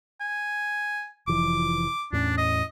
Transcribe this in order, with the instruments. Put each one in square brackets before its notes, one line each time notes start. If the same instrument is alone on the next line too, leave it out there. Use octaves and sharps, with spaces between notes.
[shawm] G#5
[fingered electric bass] F1 E3 F3 [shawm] D6
[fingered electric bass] E2 A2 C#4 [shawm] D4
[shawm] D#5